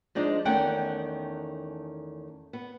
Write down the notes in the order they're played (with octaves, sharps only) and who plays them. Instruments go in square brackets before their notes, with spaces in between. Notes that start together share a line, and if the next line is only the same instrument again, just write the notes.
[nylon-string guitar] F3 G#3 D4 D#4
E2 D#3 A3 C#4 F#5 G5
B3